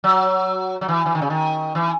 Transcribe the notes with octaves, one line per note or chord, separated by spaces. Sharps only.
F#3
F#3
E3
E3
D#3
C#3
D#3
E3